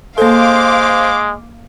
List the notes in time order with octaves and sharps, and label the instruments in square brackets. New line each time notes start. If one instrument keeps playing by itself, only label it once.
[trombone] G#3 [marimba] A#3 A4 [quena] C5 [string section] F5 D6